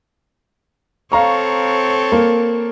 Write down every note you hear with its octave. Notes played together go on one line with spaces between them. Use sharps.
C4 A4 C#5 F5 A#5 C#6
A#3